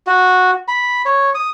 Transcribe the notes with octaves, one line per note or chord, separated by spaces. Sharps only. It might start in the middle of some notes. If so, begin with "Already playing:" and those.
F#4
B5
C#5
D#6